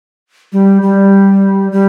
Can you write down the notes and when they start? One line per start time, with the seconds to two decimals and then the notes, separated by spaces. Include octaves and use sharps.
0.52 G3
0.82 G3
1.72 G3